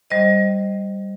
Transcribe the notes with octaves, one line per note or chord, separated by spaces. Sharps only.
G3 C5 D#5